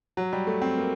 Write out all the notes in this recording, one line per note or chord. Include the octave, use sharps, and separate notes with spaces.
F#3
G3
A3
C4
A#3